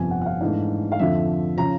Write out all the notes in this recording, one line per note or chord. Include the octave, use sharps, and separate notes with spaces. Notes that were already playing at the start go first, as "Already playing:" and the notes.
Already playing: G1 F2 C3 F3 G#5
F#5
F#5
F5
G#2 E3 A3 D4
F5
F2 D3 F3 E5
C#3 F3 A#5